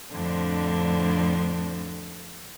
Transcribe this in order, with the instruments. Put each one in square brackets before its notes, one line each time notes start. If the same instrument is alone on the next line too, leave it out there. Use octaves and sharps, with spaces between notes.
[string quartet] F2 A2 D3 C4 D4